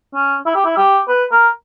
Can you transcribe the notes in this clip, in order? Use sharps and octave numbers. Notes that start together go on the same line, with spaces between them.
C#4
E4
G4
E4
G4
B4
A#4